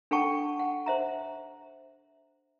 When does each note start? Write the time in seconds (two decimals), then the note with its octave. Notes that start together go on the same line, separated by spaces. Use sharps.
0.11 D4 A4 F#5 G5 A5 C#6
0.59 F#5
0.86 C5 E5 A#5